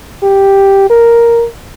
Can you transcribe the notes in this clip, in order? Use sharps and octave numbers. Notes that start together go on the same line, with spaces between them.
G4
A#4